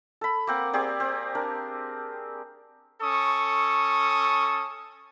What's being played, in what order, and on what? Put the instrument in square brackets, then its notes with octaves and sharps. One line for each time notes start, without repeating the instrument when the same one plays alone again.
[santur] A4 B5
A#3 C4 F#5
C4 G4 G#4 D5
C4
D4 A#4
[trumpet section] C#4 A4 C#6 D#6